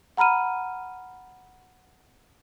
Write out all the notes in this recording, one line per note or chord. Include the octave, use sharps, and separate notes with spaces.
F#5 A#5 B5 F6 D#7